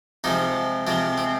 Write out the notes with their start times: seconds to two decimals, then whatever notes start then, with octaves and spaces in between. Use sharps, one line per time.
0.24 C3 F3 G#3 D#4
0.87 C3 F3 G#3 C4
1.18 C4